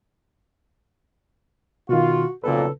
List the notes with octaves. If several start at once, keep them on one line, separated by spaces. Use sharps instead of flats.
B2 D#3 F4 F#4
B1 F2 A#2 C#3 A4 B4